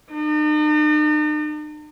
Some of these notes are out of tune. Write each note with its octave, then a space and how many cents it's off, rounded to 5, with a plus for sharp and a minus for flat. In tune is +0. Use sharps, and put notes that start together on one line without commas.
D#4 -45